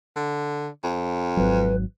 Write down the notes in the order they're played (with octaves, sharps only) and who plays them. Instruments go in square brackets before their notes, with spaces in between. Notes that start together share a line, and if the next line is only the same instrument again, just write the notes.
[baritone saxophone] D3
F2
[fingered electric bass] G#1 F#3 [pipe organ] B4